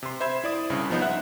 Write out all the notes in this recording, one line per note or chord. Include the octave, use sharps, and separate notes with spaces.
C3 C6
C5 E5 B5 G#6 E7
E4 D5 D#6
C2 G2 C#3
F3 B3 D#4 B4 C5
E5 F#5 F#6